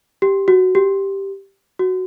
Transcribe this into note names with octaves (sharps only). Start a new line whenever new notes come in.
G4
F#4
G4
F#4